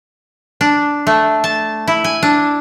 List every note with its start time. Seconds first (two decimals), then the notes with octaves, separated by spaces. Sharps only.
0.61 D4
1.07 A3
1.44 A5
1.88 E4
2.04 G#5
2.23 D4